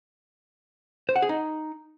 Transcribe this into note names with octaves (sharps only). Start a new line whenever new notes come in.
C5
F#5
G#4
D#4